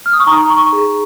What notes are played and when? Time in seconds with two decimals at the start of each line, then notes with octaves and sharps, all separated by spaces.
0.06 F6
0.13 D#6
0.20 C#6
0.26 D#4 A#5
0.50 C#6
0.73 G#4